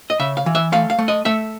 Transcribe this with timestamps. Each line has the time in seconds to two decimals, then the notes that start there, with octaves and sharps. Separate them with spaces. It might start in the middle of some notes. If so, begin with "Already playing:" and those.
0.10 D#5
0.19 C#3 E5
0.37 F5
0.46 E3
0.55 E5
0.72 A3 F5
0.90 F5
0.99 A3
1.08 D#5
1.25 A3 E5